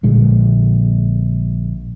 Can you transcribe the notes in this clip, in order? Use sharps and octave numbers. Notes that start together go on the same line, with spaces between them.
A#1 A#2 D3 G#3